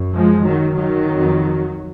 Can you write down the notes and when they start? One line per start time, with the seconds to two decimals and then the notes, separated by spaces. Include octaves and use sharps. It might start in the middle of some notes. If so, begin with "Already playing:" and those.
Already playing: F#2
0.15 F3 G#3
0.45 D#3 F#3
0.75 D#3 F#3
1.05 F2